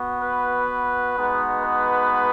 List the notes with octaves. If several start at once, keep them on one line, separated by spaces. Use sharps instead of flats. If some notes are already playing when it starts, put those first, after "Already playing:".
Already playing: B3 F#4
B4
G#3 B3 D#4 F#4
B4